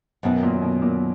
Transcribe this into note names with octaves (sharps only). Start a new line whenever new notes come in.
F#2 B2 D#3 F#3 B3
A#2
B2
A#2